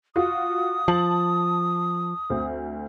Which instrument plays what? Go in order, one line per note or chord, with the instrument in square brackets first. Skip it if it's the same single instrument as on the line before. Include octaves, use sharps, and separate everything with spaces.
[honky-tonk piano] F4 F#4 [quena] D#6
[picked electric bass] F3 [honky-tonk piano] A5 F#7
[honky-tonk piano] D2 C4